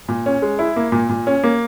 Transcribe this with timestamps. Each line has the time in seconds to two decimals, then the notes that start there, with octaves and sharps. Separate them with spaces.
0.08 A#2
0.26 C#4
0.42 G#3
0.59 E4
0.76 A#3
0.92 A#2
1.09 A#2
1.27 C#4
1.44 A#3